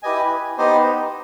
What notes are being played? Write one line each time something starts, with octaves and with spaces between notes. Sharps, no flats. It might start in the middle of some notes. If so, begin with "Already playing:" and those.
E4 G4 B4 D#5 G#5
B3 D#4 G4 C5 D#5